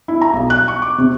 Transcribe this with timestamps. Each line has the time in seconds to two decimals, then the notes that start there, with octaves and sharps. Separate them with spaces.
0.08 E4
0.21 A#5
0.33 B1
0.50 F#6
0.68 C#6
0.82 D6
0.98 C3